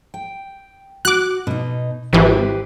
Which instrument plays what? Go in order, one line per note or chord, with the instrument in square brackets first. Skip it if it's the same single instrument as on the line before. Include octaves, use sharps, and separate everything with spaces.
[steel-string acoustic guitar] G5
[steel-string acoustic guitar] F#4 [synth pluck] D6 F#6
[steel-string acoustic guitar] B2 D#4
[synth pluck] G#1 E3 [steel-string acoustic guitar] G4 B4 C5